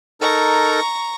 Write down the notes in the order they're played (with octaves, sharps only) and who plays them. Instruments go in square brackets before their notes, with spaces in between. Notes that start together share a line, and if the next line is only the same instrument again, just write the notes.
[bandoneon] D#4 A4 A#4 [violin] A#5 C#6